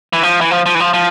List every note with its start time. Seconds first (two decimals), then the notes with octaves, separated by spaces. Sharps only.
0.13 E3
0.23 F3
0.41 E3
0.51 F3
0.66 F3
0.75 E3
0.80 F3
0.93 F3